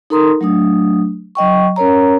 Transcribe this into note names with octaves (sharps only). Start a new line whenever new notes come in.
D#4 A4 A#4 A#5 C6 D#6
F#3 A3 D4 D#6
F#3 D#5 G5 C#6
C#4 A#4 C#5 A#5